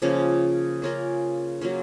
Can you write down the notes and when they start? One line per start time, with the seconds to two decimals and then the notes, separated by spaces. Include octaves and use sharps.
0.02 C#3 F3 A#3 C#4
0.82 A#3 C#4 F4 A#4
1.61 F#3 A#3 C#4 F4